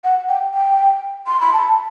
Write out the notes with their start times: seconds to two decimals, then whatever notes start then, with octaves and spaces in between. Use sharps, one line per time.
0.04 F#5
0.29 G5
0.54 G5
1.27 C6
1.40 B5
1.53 A5